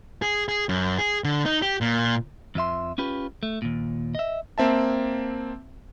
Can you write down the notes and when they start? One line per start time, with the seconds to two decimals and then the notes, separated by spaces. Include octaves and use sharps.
0.22 G#4
0.49 G#4
0.69 F#2
0.98 G#4
1.24 D3
1.46 D#4
1.62 G4
1.81 A#2
2.55 F2 F3 E5 C6
2.98 C#4 F4 G4 B4
3.43 A3
3.62 D#2 A#2
4.15 D#5 E5
4.58 A#3 C4 E5 A5